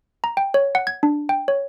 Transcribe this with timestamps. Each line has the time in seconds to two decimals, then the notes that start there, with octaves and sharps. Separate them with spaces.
0.24 A#5
0.37 G5
0.54 C#5
0.75 F#5
0.87 G#6
1.03 D4
1.29 G5
1.48 C#5